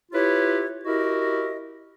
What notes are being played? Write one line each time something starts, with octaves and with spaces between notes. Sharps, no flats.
E4 F4 G4 B4 C#5
E4 F#4 G4 A#4 D#5